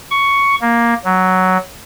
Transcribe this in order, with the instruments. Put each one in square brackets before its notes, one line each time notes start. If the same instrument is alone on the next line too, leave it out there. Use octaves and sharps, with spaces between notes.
[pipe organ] C#6
A#3
F#3